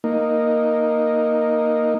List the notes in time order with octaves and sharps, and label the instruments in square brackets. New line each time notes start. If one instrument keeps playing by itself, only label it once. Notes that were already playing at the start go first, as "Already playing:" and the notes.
[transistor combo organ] A#3 D#4